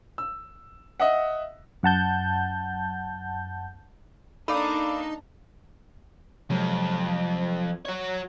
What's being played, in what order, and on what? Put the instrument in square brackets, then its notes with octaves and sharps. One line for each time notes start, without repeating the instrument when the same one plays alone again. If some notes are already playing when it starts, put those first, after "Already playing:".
[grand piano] E6
D#5 E5 F#5
[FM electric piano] F#2 F#5 A5 G6
[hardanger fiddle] A#3 D4 [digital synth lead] D#4 [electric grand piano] A4 D5 F5 [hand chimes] B5 D6
[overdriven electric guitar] F2 [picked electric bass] C3 F#3 G#3
[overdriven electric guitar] F#4 C#5